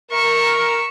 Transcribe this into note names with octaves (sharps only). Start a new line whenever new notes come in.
A#4 E5 C#6